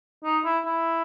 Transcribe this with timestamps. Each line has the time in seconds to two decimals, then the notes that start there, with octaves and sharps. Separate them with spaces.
0.24 D#4
0.45 E4
0.65 E4